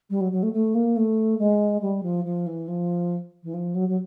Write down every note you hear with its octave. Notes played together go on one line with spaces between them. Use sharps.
G3
F#3
F#3
A3
A3
A#3
A3
G#3
G3
F3
F3
E3
F3
E3
F3
F#3
F#3